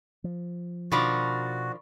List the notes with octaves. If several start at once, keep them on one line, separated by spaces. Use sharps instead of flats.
F3
B2 D#3 F3 D4 F#4 D5 B5 C#6